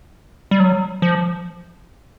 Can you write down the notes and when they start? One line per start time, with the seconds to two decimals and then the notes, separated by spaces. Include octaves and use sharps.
0.51 G3
0.60 F#3
1.02 F3